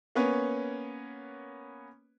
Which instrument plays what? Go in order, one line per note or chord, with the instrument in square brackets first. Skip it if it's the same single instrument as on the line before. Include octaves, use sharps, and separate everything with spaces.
[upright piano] A#3 B3 C#4 B4 C#5